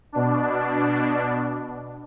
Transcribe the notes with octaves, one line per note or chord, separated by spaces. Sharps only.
B2 D4